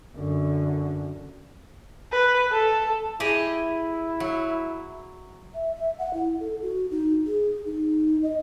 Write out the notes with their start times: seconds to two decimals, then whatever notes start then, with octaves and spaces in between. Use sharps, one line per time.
0.16 F#2 D3
2.12 B4
2.52 A4
3.20 E4 G4 G#4 D#5
4.20 F#3
5.54 E5
5.75 E5
5.98 F#5
6.14 E4
6.40 A4
6.62 F#4
6.91 D#4
7.26 G#4
7.66 D#4
8.23 D#5